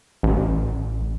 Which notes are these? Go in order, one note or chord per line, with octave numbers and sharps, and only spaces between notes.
A1